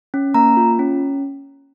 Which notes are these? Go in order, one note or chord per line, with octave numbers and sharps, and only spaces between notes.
C#4
A#3 A#5
F4
C#4